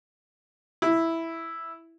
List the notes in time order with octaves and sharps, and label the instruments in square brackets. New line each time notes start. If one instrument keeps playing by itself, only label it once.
[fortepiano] E4